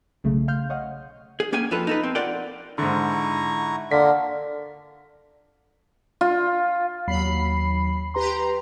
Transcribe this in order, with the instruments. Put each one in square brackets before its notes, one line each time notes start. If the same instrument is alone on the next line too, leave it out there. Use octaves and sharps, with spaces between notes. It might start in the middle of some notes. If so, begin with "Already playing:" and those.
[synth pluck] B1 C#3 A3
F5 C6 F6 G6
C#5 D#5 F5 F#5
[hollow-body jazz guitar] G#4
A#3 C#4 G#4 G5 G#5
F2 F4 A4 B4
D#4 A4 B4
C4
F4 A#4 D5 F#5 G5
[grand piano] G#2 D3 [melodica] E4 A#5 C#6
[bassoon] D3 [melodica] A#3 F4 A#4 [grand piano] B6
[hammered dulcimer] F4
[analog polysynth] D#2 F#3 B5 C7
G4 B4 A#5 C6